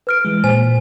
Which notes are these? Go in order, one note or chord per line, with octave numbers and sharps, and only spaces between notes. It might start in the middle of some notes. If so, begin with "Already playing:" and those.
B4 F6 D7
E3 G#3
A#2 C5 G#5